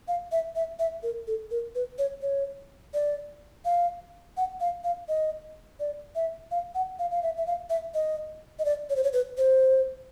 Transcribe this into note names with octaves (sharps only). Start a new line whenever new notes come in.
F5
E5
E5
E5
A#4
A4
A#4
B4
C#5
C#5
D5
F5
F#5
F5
F5
D#5
D5
E5
F5
F#5
F5
F5
E5
E5
F5
E5
D#5
D#5
D5
C#5
C5
C#5
B4
C5